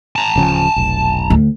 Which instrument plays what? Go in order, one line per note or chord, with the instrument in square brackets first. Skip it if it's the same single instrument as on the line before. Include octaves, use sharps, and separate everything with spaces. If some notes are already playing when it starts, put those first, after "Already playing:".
[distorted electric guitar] A5 A#5
[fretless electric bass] D1 C#3 F3
F1 B1
[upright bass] D2